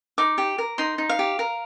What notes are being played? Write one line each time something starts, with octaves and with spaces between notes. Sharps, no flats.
D#4 D6
G4
A#4
D#4 C6
D#4
F5
G4
A#4